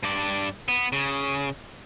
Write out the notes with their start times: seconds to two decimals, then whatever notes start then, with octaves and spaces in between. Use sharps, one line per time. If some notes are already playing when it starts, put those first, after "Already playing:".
0.03 G2 D5
0.68 B3
0.93 C#3